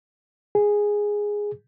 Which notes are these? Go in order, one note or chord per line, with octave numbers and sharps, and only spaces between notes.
G#4